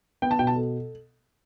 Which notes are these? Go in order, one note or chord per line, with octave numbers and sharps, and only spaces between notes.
B3 G5
A5
B2 G5
A5
A4